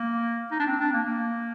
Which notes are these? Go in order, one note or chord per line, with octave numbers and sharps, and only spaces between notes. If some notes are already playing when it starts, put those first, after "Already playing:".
Already playing: A#3
D#4
D4
C4
D4
A#3
A#3